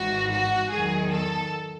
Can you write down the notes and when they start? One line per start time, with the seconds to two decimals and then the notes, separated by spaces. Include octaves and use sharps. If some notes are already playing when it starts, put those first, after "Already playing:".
Already playing: G#1 G#2 E3 F#4
0.32 F#4
0.72 E2 D#3 F#3 G#4
1.12 A4